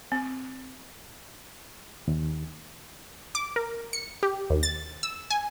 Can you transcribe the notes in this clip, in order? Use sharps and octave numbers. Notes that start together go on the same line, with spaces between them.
C4
D#2
D6
A#4
C#7
G4
D#2
A6
E6
G#5